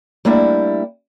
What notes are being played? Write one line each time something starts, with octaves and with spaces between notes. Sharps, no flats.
G3 A3 A#3 D4 E4